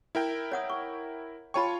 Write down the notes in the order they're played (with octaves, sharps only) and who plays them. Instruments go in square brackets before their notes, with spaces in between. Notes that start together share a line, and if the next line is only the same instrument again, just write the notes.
[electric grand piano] E4 A#4 G5
[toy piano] C#5 F#5 D#6
C#6
[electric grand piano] F4 C#5 C#6 [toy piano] G5 A5 B5